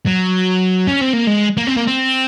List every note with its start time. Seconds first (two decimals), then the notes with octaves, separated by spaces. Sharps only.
0.07 F#3
0.87 C#4
1.01 C4
1.13 A#3
1.27 G#3
1.57 A#3
1.67 C4
1.76 A#3
1.87 C4